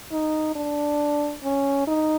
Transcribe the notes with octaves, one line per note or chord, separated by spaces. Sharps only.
D#4
D4
C#4
D#4